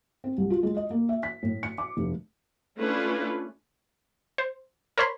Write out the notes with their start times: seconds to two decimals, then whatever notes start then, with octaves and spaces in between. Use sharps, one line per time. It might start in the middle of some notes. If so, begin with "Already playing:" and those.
0.24 C4
0.38 C2
0.50 F4
0.63 G#3
0.77 D#5
0.90 A#3
1.09 E5
1.23 B6
1.43 A2
1.63 C#7
1.78 D6
1.97 F1
2.78 A3 C#4 D4 E4 F4 B4
4.38 C5
4.98 A#4 C5 C#5 B5 C6